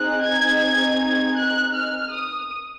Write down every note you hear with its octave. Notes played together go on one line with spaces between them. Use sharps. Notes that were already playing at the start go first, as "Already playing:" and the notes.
Already playing: C4 D#4 G#4 F#6
G#6
G#6
G#6
F#6
F6
D#6